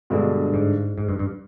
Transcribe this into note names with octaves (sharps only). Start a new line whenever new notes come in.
G2 B2 D3 G#3 D4
G#2
G#2
G2
G2